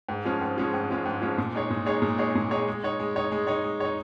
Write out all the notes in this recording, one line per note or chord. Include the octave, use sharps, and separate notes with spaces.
G#2
F3 G#3 C#4 F4
G#2
F3 G#3 C#4 F4
G#2
F3 G#3 C#4 F4
G#2
F3 G#3 C#4 F4
A#2
G#3 D#4 G#4 C#5
A#2
G#3 D#4 G#4 C#5
A#2
G#3 D#4 G#4 C#5
A#2
G#3 D#4 G#4 C#5
G#3
D#4 C#5
G#3
D#4 C#5
G#3
D#4 C#5
G#3
D#4 C#5